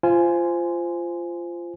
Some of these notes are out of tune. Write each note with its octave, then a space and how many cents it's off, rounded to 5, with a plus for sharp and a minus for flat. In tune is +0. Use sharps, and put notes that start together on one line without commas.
F4 -20 C5 -5 G#5 +0